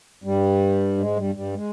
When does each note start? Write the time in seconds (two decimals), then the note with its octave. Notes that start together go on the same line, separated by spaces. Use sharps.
0.24 G2 G3
0.98 G#2 G#3
1.16 G2 G3
1.35 G2 G3
1.54 G#3